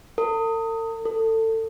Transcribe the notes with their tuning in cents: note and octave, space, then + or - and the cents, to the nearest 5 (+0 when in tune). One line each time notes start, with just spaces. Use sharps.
A4 +45
A4 +25